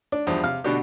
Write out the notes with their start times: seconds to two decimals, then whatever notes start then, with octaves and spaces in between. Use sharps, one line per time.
0.12 D4
0.27 E2 G2 F3
0.44 C3 F5 F6
0.64 B2 D3 D4 F#4 G4